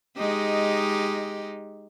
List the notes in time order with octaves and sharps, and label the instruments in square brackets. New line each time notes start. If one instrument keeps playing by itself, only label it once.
[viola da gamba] G#3 D#4 G4